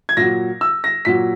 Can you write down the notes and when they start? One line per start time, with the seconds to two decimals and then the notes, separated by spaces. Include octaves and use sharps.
0.09 G#6
0.17 A#2 F#3 A#6
0.61 E6
0.84 A#6
1.05 A#2 F#3 B6